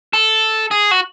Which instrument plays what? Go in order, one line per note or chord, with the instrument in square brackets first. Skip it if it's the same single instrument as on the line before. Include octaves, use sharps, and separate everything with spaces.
[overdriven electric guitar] A4
G#4
F#4